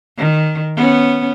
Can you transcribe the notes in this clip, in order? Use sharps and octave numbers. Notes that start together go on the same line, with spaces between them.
D#3
B3 C#4